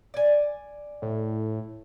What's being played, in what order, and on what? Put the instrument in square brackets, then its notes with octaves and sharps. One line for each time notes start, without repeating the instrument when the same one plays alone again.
[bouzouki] D5 G#5
[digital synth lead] A2